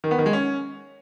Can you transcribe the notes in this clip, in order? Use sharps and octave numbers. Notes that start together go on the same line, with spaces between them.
D#3
B3
D#3
G#3
C#4